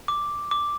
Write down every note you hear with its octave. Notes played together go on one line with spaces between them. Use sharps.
D6
D6